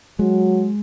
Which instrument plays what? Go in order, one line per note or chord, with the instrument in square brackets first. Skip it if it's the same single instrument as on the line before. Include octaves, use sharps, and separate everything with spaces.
[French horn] F#3 [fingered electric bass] G#3